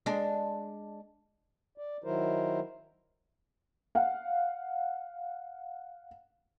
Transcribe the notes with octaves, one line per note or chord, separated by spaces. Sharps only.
G#3 D4
D5
D#3 F#3 E4 A#4 C5
F5 F#5